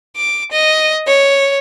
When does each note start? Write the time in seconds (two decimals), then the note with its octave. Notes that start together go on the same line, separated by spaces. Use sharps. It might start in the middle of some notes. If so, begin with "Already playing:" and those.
0.16 D6
0.52 D#5
1.07 C#5